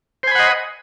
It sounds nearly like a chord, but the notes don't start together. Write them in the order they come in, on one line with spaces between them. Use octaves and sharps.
C5 G#5 B5 F#5 D#5